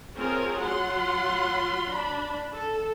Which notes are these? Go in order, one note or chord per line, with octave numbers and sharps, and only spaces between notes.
C4 F4 G#4 A#4 C#5
F#3 F4 F#5 C6
D4 B5
A4